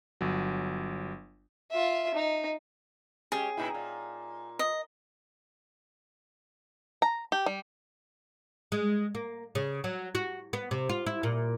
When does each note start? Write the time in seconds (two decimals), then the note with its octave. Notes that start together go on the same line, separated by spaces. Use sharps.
0.21 G1 F#3
1.72 F4 E5
2.14 D#4
3.32 G#3 C#4 G4 G#4
3.57 A#2 D#4 E4
3.75 A#2
4.59 D#5
7.02 A#5
7.32 G4
7.46 G3
8.72 G#3
9.15 A#3
9.55 C#3
9.84 F#3
10.15 F#4
10.53 B3
10.71 C3
10.89 F4
11.06 E4
11.23 A#2